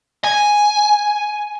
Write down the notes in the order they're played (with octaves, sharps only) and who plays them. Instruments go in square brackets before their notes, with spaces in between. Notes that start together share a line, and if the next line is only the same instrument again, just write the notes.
[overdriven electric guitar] G#5